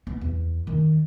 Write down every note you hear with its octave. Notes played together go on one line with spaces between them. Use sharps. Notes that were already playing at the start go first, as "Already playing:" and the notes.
B3
E2
D#3